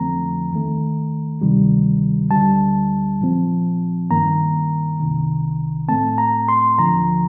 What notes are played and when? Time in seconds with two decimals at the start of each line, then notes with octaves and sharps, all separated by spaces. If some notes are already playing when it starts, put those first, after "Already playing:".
Already playing: F2 D3 F3 A3 C4 A#5
0.52 D#2 D#3 A3
1.41 D2 C3 D#3 G3
2.31 D2 D3 G3 A5
3.21 A#2 F3 C4
4.10 G2 D#3 A#3 A#5
5.00 C2 C3 D#3
5.88 A2 A3 C4 A5
6.18 A#5
6.48 C6
6.78 D2 D3 F3 A#5